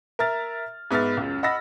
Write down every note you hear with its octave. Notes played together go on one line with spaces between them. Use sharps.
A#4 E5 F6 A6
G#2 B3 E5 F6 A6
C#2 F#2
D#5 F#5 B5 E6 A6 A#6